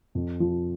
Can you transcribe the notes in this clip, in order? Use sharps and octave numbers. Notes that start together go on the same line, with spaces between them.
F2
F3